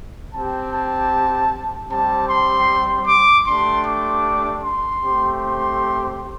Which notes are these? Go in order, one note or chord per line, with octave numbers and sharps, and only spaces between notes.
C4 G4 A5
A5
G3 C4 G4 A5
C6
D6
A3 D4 G4 C6
D6
C6
A3 C4 G4
C6